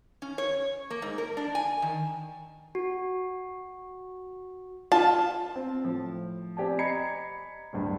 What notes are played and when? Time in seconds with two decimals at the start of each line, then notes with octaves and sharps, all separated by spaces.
0.22 C#4
0.38 C#5
0.90 A#3
1.02 G#2
1.18 A#4
1.37 D4
1.55 G#5
1.82 D#3
2.75 F#4
4.92 F4 A5
5.56 C4
5.84 A2 F3
6.57 C4 G4 D5 G#5 A5
6.79 D#5 A#5 B5 G#6 C7 C#7
7.73 D1 G2